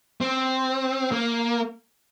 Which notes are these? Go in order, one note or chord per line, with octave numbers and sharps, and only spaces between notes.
C4
A#3